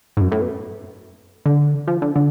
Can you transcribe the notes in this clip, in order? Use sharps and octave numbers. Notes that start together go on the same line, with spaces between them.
G#2
F#2
A2
B2
D3
F3
D3
D3